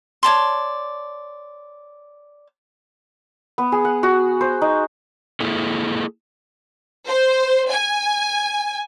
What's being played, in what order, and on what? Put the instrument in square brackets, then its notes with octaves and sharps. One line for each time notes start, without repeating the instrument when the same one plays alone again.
[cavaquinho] C#5 D5 A5 C6
[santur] B3
G#4
F#5
F#4
C5
D#4
[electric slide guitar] A#3 E4 G#4 A4
[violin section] C5
G#5